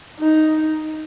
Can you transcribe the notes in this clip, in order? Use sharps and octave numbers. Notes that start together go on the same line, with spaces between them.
D#4